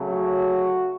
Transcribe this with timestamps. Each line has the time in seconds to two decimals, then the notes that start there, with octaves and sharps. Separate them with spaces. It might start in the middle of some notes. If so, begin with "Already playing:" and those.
Already playing: C#3 F#3 A3
0.08 F#4